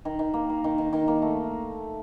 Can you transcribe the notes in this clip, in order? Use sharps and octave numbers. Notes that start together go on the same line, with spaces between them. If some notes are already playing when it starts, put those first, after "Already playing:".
D#3
D#3
A#3
A#3
D#3
D#3
D#3
A#3
A3